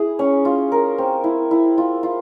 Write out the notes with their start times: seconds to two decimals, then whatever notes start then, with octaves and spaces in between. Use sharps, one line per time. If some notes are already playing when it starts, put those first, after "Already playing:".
Already playing: E4 G#4
0.19 C#4
0.45 F4
0.72 A#4
0.98 C4
1.24 E4
1.51 E4
1.78 F4
2.03 F4